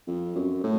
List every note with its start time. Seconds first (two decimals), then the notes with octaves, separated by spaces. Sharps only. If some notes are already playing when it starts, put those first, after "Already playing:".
0.07 F2
0.36 F#2
0.63 A2